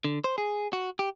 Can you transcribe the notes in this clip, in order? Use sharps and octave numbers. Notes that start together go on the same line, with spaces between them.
D3
C5
G#4
F#4
G4